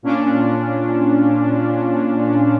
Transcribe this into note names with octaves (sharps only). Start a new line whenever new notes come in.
A#2 C#4 D4 F4